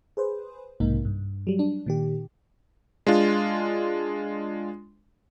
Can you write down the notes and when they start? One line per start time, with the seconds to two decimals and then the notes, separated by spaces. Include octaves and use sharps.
0.17 G#4 B4 C5
0.80 B1 G#2 C3 A#3 D#4
1.05 G2
1.47 F#3 G3
1.59 D4
1.86 A#2 D#3 G4
3.07 G#3 D4 F4